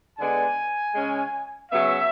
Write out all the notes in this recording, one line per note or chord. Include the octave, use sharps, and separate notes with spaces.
D3 G#3 B3 D4 G#5
C#3 G#3 C#4
C#3 F#3 B3 E5